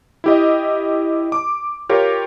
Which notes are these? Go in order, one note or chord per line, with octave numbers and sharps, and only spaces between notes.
E4 G4 D#5
D6
F4 G4 A#4 C#5